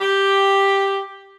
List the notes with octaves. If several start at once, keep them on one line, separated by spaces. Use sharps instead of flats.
G4